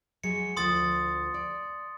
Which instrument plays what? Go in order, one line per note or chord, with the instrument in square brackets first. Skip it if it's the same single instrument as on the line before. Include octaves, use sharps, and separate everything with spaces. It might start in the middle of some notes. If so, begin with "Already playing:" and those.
[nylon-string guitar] F#3 G#3 [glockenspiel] C#7
[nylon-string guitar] D2 F3 D5 [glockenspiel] C6 D#6 A6
[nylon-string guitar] D5